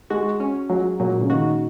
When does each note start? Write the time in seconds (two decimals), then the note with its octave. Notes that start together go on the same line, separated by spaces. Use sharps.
0.10 G#3 F#4
0.40 C#4
0.69 F#3 G#3
1.00 A#2 F#3
1.21 C#3
1.30 D#3 F#4